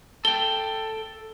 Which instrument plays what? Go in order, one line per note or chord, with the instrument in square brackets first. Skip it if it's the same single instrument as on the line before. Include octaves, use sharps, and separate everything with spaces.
[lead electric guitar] A4 G5 [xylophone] G7